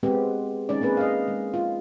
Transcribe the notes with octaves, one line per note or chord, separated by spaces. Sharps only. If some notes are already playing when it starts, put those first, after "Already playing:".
G#3 B3 C4 G4
G#3 C#4 D#4 D5
A#3 C4 G#4 B4
D#5 F5
G#3
F4